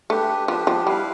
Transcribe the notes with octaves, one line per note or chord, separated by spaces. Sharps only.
A3 D4 G4 B4
F3 D4 G4 B4
F3
G3 E4 B4 F5